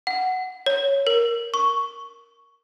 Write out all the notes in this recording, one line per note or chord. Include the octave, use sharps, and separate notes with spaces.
F#5
C#5
A#4
C#6